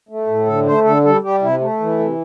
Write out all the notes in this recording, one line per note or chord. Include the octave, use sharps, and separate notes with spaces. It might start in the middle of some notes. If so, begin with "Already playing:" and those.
A3
A2
D3 A4
A3 C5
D3 A4
G3 A4
G3 G4
C3 E4
A3
E3
C3